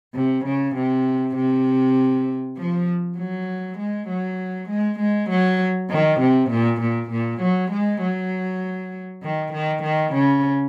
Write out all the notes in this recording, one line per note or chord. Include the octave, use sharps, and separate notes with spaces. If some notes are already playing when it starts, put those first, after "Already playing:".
C3
C#3
C3
C3
F3
F#3
G#3
F#3
G#3
G#3
F#3
D#3
C3
A#2
A#2
A#2
F#3
G#3
F#3
D#3
D#3
D#3
C#3